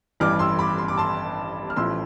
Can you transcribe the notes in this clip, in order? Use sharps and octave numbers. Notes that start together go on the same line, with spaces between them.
A1 G2 E3 G3 D6 F6
C6 E6
B5 D6
C6
D6
A5 C6
F6
A1 A2 F3 A3 C6 E6